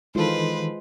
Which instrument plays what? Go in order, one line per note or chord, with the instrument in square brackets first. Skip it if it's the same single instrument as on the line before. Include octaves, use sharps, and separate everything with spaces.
[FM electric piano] D#3 E3 A4 [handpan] G#3 F4 [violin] B4 C5